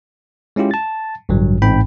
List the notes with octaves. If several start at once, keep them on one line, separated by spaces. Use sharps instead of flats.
G#3 C#4 E4 F4 G4
A5 A6
A1 G2 D3 F#3
A1 G#2 C4 D#4 G5 B5